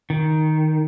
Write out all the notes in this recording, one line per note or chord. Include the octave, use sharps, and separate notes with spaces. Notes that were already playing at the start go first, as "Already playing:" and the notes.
D#3